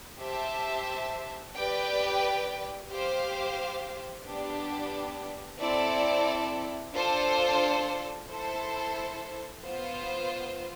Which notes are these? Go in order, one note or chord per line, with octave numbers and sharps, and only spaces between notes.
G4 C5 E5 A5
G4 B4 D5 G5
G4 C5 F5
B3 D4 G4
C4 E4 A4 D5
D4 F4 A4 C5
E4 A4 C5
B3 F4 C5